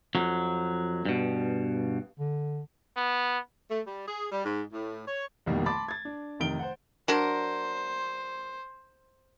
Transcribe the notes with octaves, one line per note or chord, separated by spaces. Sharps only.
F2 F#3
G2 B2
D3
B3
A3
G3
G#4
G3
G#2
A2
C#5
F1 C2 B2 D#3 G3 A#3
A5 B5 C6 D6 A6
G#6 A6
D4
F1 C3 D#3 D7 G7
C5 F#5
F#3 D4 A#4 C5